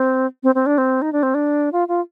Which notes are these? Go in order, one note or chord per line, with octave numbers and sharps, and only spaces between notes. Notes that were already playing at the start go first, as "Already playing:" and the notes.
Already playing: C4
C4
C4
D4
C4
D#4
D4
C4
D4
F4
F4